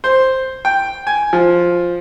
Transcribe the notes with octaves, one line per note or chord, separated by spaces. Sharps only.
C5
G5
G#5
F3